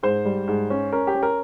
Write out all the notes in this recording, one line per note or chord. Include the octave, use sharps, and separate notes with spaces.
G#2 C5
G3
G#2
C#4
C#4 A#4
G4
C#4
A#4